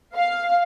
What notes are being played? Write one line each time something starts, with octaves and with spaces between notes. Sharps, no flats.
F5